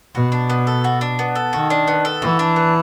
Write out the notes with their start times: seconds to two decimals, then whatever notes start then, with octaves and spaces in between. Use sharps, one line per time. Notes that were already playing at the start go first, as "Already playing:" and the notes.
0.15 B2 F#4
0.32 D4
0.50 B3
0.67 A4
0.84 F#4
1.01 D4
1.19 B3
1.35 A4
1.53 D#3 F#4
1.70 D4
1.87 B3
2.05 A4
2.22 E3 F#4
2.39 D4
2.56 B3